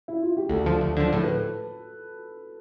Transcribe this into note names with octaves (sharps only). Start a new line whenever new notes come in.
E4
F4
G4
D2 A4
D3 F3
D2
D3 F3
A2 A4
B4